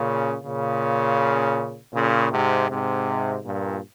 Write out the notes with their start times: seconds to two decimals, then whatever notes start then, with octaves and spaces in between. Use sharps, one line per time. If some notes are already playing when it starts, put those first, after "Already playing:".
Already playing: A#2 C#3
0.44 A#2 C#3
1.94 A#2 C#3
2.32 G#2 C3
2.69 G#2 C3
3.44 G2 A#2